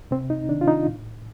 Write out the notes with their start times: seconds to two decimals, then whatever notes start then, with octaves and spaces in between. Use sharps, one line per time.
0.11 C3 C4
0.30 D#4
0.49 D#3 D4
0.61 F4
0.68 D#4
0.86 A2